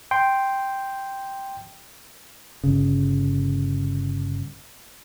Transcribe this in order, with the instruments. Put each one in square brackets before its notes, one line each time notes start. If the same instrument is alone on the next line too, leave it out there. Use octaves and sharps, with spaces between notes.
[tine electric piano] G5 C6
[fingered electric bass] G1 C#3